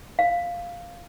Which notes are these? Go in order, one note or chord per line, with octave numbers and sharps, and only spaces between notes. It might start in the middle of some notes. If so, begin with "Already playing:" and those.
F5